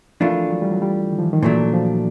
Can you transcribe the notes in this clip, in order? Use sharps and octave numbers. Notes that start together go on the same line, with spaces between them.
E3 F3 A3 D4 F4 A#4
F#3
G3
F#3
G3
D#3
F3
E3
D#3
A#2 E3 F#3 A3 D4
F3
F3